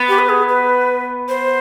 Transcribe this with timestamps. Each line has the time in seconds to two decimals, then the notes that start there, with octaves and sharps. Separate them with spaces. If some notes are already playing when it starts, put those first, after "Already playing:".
Already playing: B3
0.09 G4
0.19 B4
0.29 G#4
0.49 B4
1.29 C5